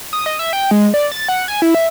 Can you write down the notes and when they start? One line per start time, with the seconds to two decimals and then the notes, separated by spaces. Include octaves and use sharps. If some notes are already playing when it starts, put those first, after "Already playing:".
0.13 D#6
0.26 D#5
0.39 E5
0.53 G5
0.71 G#3
0.94 D5
1.12 A6
1.29 F#5
1.48 G#5
1.62 E4
1.75 E5